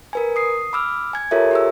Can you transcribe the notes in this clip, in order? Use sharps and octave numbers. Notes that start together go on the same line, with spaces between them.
A#4 B4 G#5
D#6 C7
B5 D6 E6 F6
G#5 G#6
F4 G4 A4 A#4 C#5 E5
G4 G#4 E6